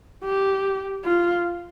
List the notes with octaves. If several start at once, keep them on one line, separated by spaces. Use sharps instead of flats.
G4
F4